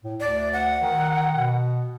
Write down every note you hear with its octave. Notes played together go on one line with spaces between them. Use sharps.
A2
D2 D5
F#5
D#3
B2